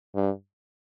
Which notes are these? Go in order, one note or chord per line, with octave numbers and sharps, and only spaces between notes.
G2